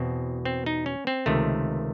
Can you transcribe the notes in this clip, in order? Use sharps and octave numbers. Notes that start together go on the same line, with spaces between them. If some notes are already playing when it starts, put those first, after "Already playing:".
Already playing: E2 B2 C4
C4
D#4
C#4
C4
C#2 C3 D#3 A3